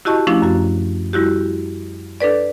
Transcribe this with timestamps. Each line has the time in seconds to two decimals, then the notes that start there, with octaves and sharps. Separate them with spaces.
0.05 E4 F#4 G4 D#5 A5 C#6
0.27 F3 A3 C#4 D4 E4
0.42 F#2 F#4
1.13 G3 E4 F#4 G4
2.20 D4 A4 B4 D5